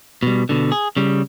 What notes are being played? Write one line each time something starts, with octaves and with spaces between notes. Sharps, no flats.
B2 G3
B2 D3
G#4
C#3 G3